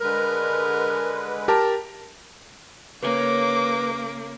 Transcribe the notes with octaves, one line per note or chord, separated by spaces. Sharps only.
D3 G#3 A#4 B4
G4 A#4 A5
C#3 A#3 B4 G#5 D6